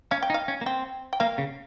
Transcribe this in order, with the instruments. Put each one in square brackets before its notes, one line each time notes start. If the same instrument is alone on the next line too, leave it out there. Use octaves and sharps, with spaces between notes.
[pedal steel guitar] C#4 [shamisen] F5
[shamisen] G5
[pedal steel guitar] D#4
[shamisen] F5
[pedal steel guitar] C#4
A#3
[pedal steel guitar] C4 [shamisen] G5
[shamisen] G5
[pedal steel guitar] A#3 [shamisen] F5
[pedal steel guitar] C#3